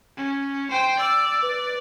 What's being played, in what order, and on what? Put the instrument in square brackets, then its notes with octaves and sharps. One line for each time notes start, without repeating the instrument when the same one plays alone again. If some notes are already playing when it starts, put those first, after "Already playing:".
[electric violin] C#4
C5 G5
[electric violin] D5 [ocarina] E6
[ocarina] B4